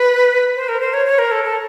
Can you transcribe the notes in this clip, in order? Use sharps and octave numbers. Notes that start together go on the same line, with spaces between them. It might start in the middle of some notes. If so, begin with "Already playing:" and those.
Already playing: B4
C5
A#4
C5
C#5
C#5
A#4
A4
A4